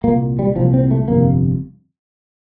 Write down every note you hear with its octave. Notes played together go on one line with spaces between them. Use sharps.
C2 A#2 A#3
G3
C2 A#2 F3
C4
A3
G1 F2 C3 A#3